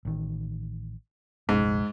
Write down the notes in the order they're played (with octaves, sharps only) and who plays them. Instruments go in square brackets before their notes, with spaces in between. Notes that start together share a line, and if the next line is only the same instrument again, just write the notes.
[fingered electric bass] A1 D#3
[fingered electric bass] F1 A#1 [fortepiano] G#2